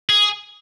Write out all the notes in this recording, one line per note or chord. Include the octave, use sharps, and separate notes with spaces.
G#4